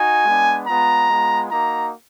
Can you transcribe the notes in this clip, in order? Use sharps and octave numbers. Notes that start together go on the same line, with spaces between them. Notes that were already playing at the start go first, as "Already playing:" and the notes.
Already playing: D#4 F#4 G#5
G#3 B3 D4
G#3 B3 F4 A#5
G#3 B3 F4
A#3 D#4 F#4 A#5